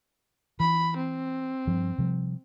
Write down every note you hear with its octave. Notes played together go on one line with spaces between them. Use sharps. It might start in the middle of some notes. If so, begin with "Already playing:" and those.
E3 B5
C4
G2 F3
C3 F3 G3